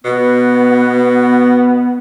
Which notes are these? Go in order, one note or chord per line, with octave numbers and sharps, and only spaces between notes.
B2 B3